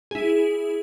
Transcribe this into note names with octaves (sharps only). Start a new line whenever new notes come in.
E4 G#4